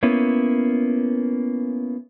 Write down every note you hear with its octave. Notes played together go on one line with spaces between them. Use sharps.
A#3 B3 C#4 E4